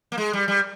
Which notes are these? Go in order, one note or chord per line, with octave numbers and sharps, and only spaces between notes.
A#3
G#3
G3
G3